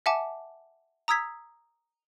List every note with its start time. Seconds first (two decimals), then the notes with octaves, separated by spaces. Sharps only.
0.06 E5 F#5 G#5 A5 D6
1.08 A#5 D#6 E6 G#6 B6